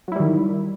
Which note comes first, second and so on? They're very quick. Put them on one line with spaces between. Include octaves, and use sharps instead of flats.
F#3 E4 G3 D#3